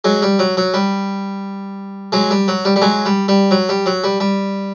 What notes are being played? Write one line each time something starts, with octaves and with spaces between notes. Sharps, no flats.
F#3 G#3
G3
F#3
F#3
G3
F#3 G#3
G3
F#3
G3
G3
F#3 G#3
G3
G3
F#3
G3
F#3
G3
G3